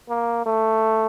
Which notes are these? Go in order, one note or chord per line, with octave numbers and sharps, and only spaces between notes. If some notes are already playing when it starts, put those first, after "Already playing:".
A#3
A3